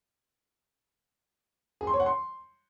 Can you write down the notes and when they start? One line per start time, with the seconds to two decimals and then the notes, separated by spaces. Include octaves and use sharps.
1.81 G#4
1.87 C6
1.93 C#5
2.00 F#5
2.06 C6